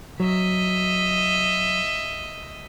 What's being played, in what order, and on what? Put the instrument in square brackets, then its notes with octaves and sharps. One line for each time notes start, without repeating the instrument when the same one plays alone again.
[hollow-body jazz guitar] F#3 [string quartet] D#5 E5